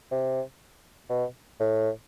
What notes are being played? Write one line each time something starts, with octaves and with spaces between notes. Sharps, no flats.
C3
B2
A2